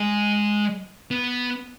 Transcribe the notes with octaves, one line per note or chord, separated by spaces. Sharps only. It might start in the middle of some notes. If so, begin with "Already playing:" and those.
Already playing: G#3
B3